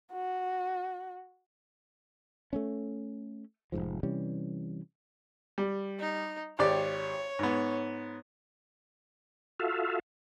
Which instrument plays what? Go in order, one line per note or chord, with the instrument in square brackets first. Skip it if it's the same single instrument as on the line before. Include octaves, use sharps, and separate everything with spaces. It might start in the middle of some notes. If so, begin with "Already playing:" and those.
[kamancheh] F#4
[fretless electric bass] A3 B3 C#4
F1 C2 G#2 F3
C3 E3 G3 C#4
[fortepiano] G3
[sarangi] D#4
[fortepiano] G#1 G4 D5 [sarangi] C#5
[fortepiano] G#2 B3
[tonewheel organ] F4 F#4 A4 E5 F5